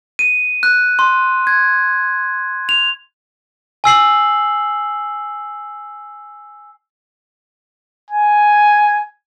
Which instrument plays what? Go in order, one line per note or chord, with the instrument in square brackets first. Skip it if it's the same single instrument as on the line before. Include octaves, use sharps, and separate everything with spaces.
[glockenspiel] D#7
F#6
C6
G#6
F7
G#5 E6 C7 F#7
[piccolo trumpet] G#5